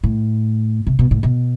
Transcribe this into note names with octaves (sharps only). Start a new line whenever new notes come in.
A2
C3
B2
A2
B2